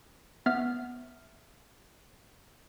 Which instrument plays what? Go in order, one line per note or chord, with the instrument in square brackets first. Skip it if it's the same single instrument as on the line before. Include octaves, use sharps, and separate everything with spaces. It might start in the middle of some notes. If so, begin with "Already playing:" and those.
[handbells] B3 E5 F6